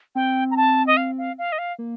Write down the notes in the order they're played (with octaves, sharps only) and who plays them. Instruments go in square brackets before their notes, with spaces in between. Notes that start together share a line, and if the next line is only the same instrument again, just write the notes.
[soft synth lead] C4 [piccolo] G5
[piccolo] A#5
A5
D#5
F5
F5
F5
D#5
F5
[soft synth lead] A#3